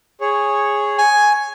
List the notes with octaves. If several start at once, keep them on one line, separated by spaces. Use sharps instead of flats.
G#4 C#5
G#5